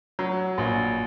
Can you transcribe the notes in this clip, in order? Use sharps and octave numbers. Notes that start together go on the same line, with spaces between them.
F#3
A#1